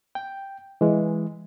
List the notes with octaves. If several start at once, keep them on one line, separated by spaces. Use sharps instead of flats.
G5
E3 G#3